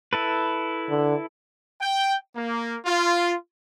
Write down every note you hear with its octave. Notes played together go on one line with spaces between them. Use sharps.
E4 A4 B4
D3
G5
A#3
F4